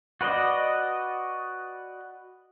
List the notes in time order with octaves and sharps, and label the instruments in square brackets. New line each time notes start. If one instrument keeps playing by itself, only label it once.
[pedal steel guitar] F#4 B4 D5 D#5